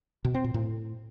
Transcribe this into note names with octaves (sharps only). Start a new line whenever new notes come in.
B2
C4
A#2
A2